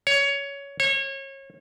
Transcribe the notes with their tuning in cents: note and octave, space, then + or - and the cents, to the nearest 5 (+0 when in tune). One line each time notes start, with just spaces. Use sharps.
C#5 +15
C#5 -30